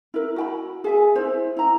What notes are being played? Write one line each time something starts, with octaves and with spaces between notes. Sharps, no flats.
E4 A#4
F#4 G5 B5
G#4 E5 G#5
E4 C5
E4 A#5